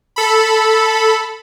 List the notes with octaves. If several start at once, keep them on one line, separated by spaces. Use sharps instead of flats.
A4 B5